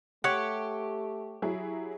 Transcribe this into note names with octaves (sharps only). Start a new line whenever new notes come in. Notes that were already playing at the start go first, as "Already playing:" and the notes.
A3 G4 C#5 F#5
F#3 E4 G#4